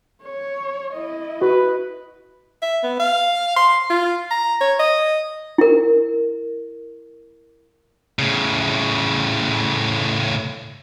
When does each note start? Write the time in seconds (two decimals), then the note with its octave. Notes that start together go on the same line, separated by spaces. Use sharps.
0.23 C#5
0.94 E4 D#5
1.42 F#4 B4
2.62 E5
2.83 B3
2.99 F5
3.56 C6
3.90 F4
4.30 A#5
4.61 C#5
4.79 D#5
5.58 E4 A#4
8.19 A2 C#3